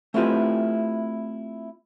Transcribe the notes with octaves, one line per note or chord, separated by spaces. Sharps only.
A3 C4 E4 F4 G4 B4